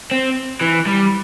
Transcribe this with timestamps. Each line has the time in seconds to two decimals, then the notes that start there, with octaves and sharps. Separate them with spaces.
0.11 C4
0.61 E3
0.86 G3